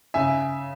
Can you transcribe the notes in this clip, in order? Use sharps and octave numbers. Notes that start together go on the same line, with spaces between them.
C#3 E5 G#5